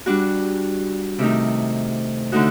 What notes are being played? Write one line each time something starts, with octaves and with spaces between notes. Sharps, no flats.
G3 D4 F#4
C3 D#3 A3 D#4
D3 A3 D#4 F#4